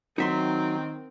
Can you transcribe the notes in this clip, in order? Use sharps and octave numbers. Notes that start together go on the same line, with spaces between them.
D#3 F#3 C4 D#4 E5 C6